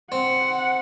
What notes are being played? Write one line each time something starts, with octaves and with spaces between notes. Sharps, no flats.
C4 F#5